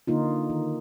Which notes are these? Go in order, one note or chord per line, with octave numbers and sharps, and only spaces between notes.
D3 A#3 D#4 F4
D#3